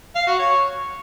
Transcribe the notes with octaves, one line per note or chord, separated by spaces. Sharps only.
F5
F#4
C#5